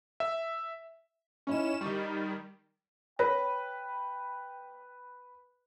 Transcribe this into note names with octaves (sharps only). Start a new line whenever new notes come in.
E5
C#4 D#4 E4 C#5 E7
D#3 G3 C#6
B4 C#5 G5